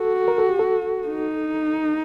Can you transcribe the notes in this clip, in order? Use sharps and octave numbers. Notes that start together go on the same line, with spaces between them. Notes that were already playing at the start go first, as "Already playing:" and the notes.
Already playing: F#4 A4
A#4
A4
G4
A4
D#4